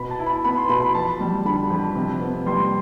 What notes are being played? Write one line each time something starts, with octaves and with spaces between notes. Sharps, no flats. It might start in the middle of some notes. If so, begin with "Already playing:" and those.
Already playing: B2 B5
A5
E4
B5
B3 B5
C6
B2 B5
B5
F2 A5
G3
D3 B5
F2
C3
B3
G3 C6